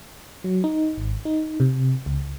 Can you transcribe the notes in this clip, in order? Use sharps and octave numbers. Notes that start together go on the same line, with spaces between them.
F#3
D#4
G#1
D#4
C3
C#2